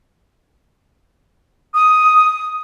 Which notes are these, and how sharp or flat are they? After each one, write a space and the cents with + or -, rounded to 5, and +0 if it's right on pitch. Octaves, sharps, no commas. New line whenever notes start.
D#6 +5